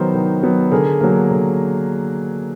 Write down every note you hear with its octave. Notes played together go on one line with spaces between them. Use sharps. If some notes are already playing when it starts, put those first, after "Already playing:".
Already playing: D#3 F#3 B3 A#4 C5
D#3
F#3 B3
D3 G#4 A#4
F#3 A#3
D3